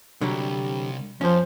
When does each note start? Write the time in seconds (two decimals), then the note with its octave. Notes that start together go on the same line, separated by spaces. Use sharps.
0.21 C2 D3 F#3 G3
1.21 F2 F3 C#4 C5